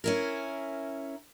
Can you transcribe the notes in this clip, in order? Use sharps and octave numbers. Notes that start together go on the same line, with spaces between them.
C#4 E4 A#4